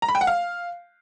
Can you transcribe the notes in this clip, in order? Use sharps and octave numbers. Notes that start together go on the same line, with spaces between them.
A#5
B5
G5
F#5
F5